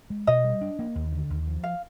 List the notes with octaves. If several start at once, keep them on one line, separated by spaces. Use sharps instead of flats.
G#3
B2 D#5
G3
D4
A#3
D#2
D3
D#2
F3
F5